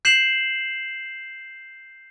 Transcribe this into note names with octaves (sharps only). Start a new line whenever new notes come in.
G6 C7 E7 F#7